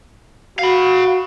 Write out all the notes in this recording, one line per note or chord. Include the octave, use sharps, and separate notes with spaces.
F#4 F5 B5